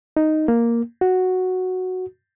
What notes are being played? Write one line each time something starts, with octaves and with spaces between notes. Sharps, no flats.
D#4
A#3
F#4